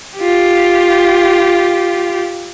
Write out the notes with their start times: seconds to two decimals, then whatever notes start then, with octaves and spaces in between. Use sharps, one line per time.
0.20 F4 G4